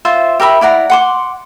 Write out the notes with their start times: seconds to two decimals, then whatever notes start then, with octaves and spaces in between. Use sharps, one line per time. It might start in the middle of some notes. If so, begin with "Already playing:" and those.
0.05 F4 C5 E5
0.40 G4 A#4 E5 B5
0.61 E4 D5 F#5 A#5
0.90 F#5 C6 D6